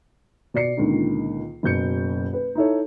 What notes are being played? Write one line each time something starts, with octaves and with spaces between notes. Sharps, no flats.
B2 D5 C7 C#7
C#2 A#2 D3 D#3
F#1 B2 G6 C#7
B4
D#4 E4 A4 C#5